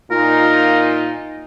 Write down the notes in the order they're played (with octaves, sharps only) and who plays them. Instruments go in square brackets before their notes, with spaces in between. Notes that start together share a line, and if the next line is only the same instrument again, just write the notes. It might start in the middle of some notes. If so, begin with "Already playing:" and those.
[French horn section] A#2 D#4 F4 [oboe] A#4